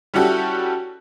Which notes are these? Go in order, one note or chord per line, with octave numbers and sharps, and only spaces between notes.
G3 C#4 E4 F#4 G4 A4